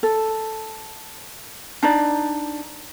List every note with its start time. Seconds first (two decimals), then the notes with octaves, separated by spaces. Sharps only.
0.03 A4
1.83 D4 D#4 D5